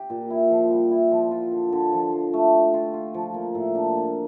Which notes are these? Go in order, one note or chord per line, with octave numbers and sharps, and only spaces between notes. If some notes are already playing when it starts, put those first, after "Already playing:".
Already playing: G4
A#2
E4
F3
G3
E4
F3
F4
D3
D3
F3
F3
A3
G4
F4
F4
F3
A#3
A2
D4
A#3